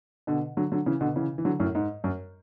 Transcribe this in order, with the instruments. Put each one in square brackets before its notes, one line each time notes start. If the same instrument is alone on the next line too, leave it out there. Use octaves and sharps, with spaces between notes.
[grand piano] B2 D3
D3 F#3
D3 F#3
C#3 E3
B2 D3
C#3 E3
E3
D3 F#3
F#2 A2
G#2
F#2